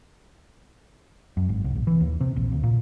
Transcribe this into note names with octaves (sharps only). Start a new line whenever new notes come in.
F#2
G#1
C2
A#1
E3
D#2
C3
A#1
D2
A#2